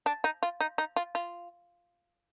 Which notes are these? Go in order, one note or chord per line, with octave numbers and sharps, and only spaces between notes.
D4
D#4
F4
D#4
D#4
F4
F4